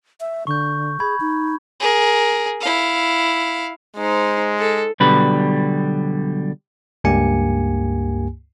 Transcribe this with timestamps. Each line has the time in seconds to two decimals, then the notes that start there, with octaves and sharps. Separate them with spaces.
0.20 E5
0.47 D3 C#6 G6
1.00 G#4 B5 G#6
1.20 D#4
1.80 G#4 A#4
2.61 E4 F5
3.97 G#3 D#4 C5
4.60 A4
5.00 B1 B2 D3 G3 B4
7.04 C#2 G2 A#3 G4 G#5 C#7